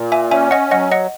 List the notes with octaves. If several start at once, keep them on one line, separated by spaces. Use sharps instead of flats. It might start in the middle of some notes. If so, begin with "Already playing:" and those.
Already playing: A#2
E5 G#5
C#4 E5 G#5
D#5 F#5
F#3 D#5 F#5
D#5 F#5